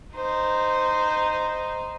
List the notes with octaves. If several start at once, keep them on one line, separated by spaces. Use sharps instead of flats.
D#4 C5